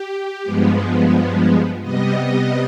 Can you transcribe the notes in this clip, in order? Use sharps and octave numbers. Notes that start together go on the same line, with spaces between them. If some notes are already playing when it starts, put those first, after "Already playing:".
Already playing: G4
G2 F3 G#3 B3
C3 G3 B3 D#5